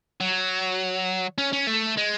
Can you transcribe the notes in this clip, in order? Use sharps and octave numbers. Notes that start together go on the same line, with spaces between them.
F#3
C#4
C#4
A3
G#3